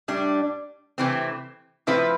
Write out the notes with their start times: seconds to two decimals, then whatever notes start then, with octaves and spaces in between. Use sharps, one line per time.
0.08 A2 G3 D4
0.98 C3 E3 A3 C4
1.87 A2 F3 C4 E4 B4